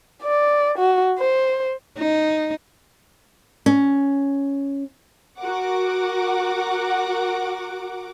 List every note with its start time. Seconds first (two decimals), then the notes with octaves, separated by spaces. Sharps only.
0.23 D5
0.78 F#4
1.18 C5
1.98 D#4
3.66 C#4
5.39 F#4 A#4 F#5 D6